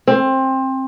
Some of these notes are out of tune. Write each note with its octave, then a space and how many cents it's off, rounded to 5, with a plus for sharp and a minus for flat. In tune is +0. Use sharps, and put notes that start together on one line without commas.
C4 +20